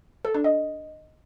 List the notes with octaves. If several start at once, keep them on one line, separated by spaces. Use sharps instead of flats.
A4
D4
D#5